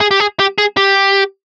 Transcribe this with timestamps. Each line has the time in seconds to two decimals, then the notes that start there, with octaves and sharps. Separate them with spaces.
0.01 G#4
0.11 G4
0.20 G#4
0.40 G4
0.58 G#4
0.77 G4